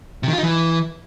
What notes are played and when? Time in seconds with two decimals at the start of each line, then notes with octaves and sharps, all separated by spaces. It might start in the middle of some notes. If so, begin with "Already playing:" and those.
0.23 C3
0.28 D#3
0.33 F4
0.38 D#4
0.43 E3